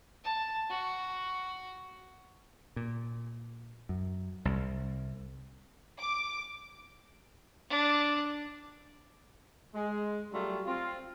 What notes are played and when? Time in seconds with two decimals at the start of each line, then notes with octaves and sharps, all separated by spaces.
0.25 A5
0.71 F#4
2.76 A#2
3.89 F#2
4.45 C2
5.99 D6
7.69 D4
9.74 G#3
10.32 F#3 G3 A3 F4
10.67 C4 F4